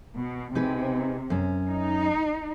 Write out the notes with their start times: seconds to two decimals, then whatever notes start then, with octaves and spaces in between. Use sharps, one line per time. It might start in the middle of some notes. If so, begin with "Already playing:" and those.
0.17 B2
0.55 C3 D#4 G#4 B4
1.30 F#2 C#4
1.72 D#4